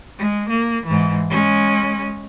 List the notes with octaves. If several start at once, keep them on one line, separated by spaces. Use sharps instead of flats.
G#3
A#3
G#2 E3
G#3 C#4